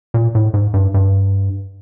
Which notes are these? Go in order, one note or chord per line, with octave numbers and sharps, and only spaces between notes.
A#2
A2
G#2
G2
G2